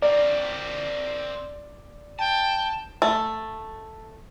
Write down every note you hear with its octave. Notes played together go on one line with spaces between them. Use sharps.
C4 A#4 D5
G5 A5
A3